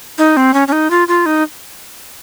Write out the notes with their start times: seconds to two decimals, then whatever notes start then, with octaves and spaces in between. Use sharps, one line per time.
0.18 D#4
0.37 C4
0.54 C#4
0.68 C#4
0.72 D#4
0.90 F4
1.08 F4
1.26 D#4